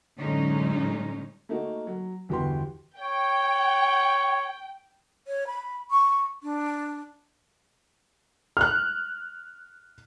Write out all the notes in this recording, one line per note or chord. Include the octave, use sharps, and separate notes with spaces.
F#2 A2 D3 G#3 C#4 D#4
A3 A#3 D#4 F#4
F#3
G1 E2 F#4 G4 B4 C6
C#5 G5
C#5
B5
C#6
D4
F6 F#6